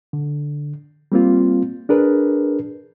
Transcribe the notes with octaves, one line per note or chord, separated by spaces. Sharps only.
D3
G3 A#3 C4 F4
D4 G#4 A#4 B4